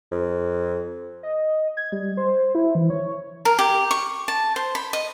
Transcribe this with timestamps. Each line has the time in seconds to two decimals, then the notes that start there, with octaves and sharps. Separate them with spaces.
0.11 F2
1.23 D#5
1.77 G#6
1.92 G3
2.17 C5
2.55 E4
2.75 E3
2.90 C#5
3.45 A#4
3.59 G4
3.91 C#6
4.28 A5
4.56 C5
4.75 B5
4.93 D#5